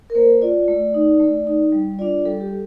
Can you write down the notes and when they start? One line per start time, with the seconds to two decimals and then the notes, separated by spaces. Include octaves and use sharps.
0.10 A#4
0.15 A#3 C5
0.42 F4 D5
0.68 A3
0.94 D#4
1.20 A3
1.47 D#4
1.72 G3
1.99 D4 F4 D5
2.25 G3 A4
2.41 G4